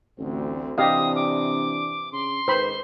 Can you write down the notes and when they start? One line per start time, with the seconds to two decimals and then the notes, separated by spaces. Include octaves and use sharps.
0.18 A1 D2 C4
0.78 C3 E3 D4 G4 D#5 F5 D#6
1.16 D6
2.12 C#3 C6
2.48 G#2 D#3 B4 C5 B5